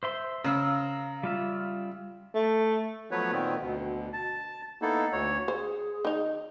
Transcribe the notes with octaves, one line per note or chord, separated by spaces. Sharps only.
C5 E5 C6
C#3 A#4 F5 E6
G3 F4 E5
A3
F3 F#3 A3 B3 B4 C#5
A#2 D#3 B3 C4
D2 B2
A5
A#3 B3 D#4 E4 A4
D2 C#5
G#4 C5
D#3 D#4